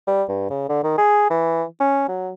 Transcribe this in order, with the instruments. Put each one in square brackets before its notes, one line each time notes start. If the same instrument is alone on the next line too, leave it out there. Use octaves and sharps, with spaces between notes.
[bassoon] G3
G2
C#3
D3
D#3
G#4
E3
C#4
F#3